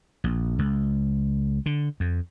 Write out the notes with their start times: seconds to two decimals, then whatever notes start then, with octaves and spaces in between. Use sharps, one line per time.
0.24 A#1
0.59 C#2
1.66 D3
2.00 F2